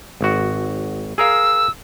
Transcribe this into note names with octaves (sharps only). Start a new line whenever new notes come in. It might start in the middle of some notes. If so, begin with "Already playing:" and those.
G#1 F#4
G#4 A#4 F5 E6